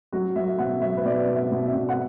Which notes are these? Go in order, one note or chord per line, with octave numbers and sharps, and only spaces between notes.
F#3 F#4
F#3 E5
E5
B2 F#5
F#3 E5
B4
B2 D5
B2
E5
B2
E5
B2
F#5